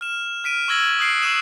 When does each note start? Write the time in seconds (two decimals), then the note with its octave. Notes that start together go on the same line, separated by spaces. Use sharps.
0.01 F6 E7
0.44 F6 B6 D7 D#7
0.68 C#6 E6 G#6 A#6 F#7
0.99 D#6 F#6 C7 D7
1.22 C#6 D#6 F#6 D#7 E7